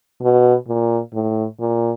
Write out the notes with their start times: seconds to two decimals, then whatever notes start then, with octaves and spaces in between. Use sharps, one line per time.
0.22 B2
0.68 A#2
1.13 A2
1.59 A#2